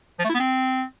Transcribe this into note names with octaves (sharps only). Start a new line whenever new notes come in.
F3
A3
E4
B3
C4